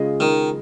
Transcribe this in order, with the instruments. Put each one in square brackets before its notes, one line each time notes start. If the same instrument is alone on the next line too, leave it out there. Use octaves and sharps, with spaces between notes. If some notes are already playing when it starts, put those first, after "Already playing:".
Already playing: [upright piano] C#3 G#3 F4 G#4 D#5
[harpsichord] D#3